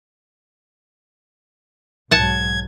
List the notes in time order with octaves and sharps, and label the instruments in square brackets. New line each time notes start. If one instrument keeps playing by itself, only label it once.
[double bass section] B1 G#2 F#3 [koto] F#5 A5 [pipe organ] G#6